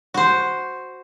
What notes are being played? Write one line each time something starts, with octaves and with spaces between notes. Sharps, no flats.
F#4 C5